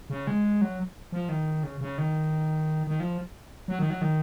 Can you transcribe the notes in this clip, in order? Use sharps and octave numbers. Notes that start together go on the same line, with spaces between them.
C#3
G#3
F#3
F3
D#3
C#3
C#3
D#3
D#3
F3
F#3
D#3
F#3
D#3